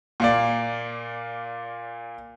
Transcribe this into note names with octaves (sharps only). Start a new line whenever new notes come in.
A#2 A#3 D5